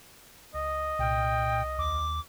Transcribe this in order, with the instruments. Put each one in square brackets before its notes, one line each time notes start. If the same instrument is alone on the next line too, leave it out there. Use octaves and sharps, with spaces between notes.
[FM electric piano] C#2 [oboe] D#5
[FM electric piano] C2 F6 [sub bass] A#2 [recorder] G5
[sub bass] D#2 [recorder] D6